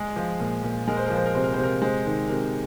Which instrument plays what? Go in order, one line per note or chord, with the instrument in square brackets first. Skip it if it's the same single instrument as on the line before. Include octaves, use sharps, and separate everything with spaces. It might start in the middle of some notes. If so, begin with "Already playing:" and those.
Already playing: [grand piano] G#3 G#4
F3
A#2
A#2
G#3 A#4
C5
F3 A#4
C5
A#4
C3 C5
A#4
C3 C5
A#4
G#3 C5
D#3
C3 A#4